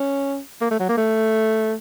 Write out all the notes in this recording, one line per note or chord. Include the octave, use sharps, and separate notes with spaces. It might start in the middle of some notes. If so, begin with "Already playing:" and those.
Already playing: C#4
A#3
A3
F#3
A#3
A3